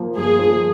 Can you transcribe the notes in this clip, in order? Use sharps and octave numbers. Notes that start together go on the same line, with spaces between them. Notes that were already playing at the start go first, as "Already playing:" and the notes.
Already playing: F3 A#3
G1 G#4
F3